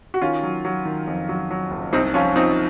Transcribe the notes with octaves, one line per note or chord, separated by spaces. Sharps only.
F#4
D#3 C#4 F4
F#3
F#3
D#3
F2
F#3
F#3
F#1
C2 C4 D#4
F3 C#4 F4
F3 C4 D#4